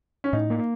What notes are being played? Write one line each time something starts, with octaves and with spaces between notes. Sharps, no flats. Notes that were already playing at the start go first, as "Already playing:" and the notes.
C#4
A2 D#4
A#3